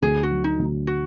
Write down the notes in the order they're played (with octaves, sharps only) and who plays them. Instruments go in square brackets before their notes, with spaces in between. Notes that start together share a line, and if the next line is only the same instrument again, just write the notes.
[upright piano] D2 [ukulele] G#4
[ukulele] F#4
[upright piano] F#3
[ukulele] D#4
[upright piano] D2
[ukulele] F#4